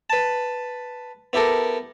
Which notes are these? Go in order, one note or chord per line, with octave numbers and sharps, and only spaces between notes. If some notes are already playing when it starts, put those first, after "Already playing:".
B4 A5
B3 E4 G4 A4 A#4